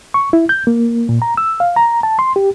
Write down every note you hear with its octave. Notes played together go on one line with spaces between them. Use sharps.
C#6
E4
G6
A#3
A#2
A#5
E6
F5
A#5
A5
C6
G4